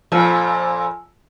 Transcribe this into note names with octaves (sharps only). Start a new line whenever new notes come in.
F2 A#2 F3 G#5 E6